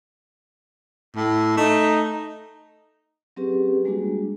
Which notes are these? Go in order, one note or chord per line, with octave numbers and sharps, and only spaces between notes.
A2
A3 D#4
F#3 C4 C#4 G4 G#4 B4
G3 G#3 A#3 D4 F#4 G#4